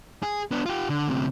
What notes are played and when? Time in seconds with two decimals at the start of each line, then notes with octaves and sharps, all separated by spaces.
0.23 G#4
0.51 B3 D4
0.66 F4 G4
0.89 D3
1.08 D2 C3